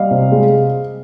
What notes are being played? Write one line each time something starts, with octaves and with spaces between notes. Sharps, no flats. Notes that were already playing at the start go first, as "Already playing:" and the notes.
Already playing: G3 D#5 F5
C3
G#3